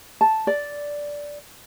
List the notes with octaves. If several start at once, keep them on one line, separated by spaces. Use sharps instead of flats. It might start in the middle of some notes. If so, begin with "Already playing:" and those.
A5
D5